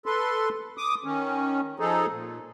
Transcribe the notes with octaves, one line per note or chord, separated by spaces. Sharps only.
A4 B4 C6
D6 D#6
D#3 C#4
F3 D#4 G#4 A4
A#2